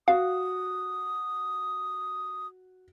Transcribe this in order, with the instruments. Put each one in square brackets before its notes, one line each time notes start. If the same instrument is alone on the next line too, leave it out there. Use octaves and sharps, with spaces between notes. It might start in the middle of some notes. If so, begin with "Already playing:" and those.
[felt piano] F#4 [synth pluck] F5 [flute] D#6